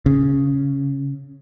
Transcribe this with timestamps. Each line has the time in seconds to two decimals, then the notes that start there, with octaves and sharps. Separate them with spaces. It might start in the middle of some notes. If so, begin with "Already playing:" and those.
0.06 C#3